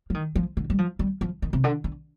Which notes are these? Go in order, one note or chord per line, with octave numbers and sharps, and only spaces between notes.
F3
D#3
F3
D3
G3
F3
G3
F3
D#3
C3
D3
D3